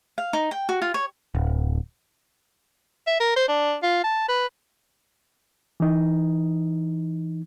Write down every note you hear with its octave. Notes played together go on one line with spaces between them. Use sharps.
F5
D#4
G5
F#4
F4
C#5
D1
E5
A#4
C5
D4
F4
A5
B4
E3 D#4